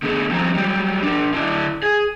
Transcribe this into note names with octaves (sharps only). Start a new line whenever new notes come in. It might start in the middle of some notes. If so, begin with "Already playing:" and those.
D3 B3 G#4 A4
F3 G3 C4 F#5 A#5
F#3 G3 G4
D4 A#4
D3 D4 E4 D5
G#4